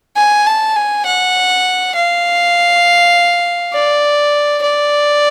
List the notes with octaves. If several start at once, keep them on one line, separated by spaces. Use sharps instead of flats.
G#5
A5
G#5
F#5
F5
D5
D5